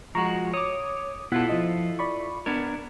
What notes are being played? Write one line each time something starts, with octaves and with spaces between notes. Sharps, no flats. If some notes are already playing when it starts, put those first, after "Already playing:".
F3 G#3 F#4 A#5 C#6
C#5 D6 D#6
B2 E4 F4 A4 F#5
F3 D#5
D5 B5 C#6
B3 D4 A#4 G#6